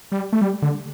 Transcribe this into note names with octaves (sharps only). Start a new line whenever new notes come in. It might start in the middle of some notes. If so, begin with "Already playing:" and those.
G3
A3
G3
D3